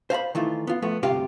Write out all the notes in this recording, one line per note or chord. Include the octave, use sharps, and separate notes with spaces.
C5 F5 A#5 B5
D#3 E3 A3 F4
B3 F4
F3 A3 B3
D2 G2 C3 F4 G4 F5